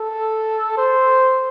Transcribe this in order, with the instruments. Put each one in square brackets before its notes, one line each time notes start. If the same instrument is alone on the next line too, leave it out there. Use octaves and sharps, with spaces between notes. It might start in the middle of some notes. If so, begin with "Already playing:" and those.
Already playing: [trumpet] A4
C5